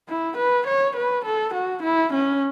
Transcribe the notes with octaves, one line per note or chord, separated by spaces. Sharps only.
E4
B4
C#5
B4
A4
F#4
E4
C#4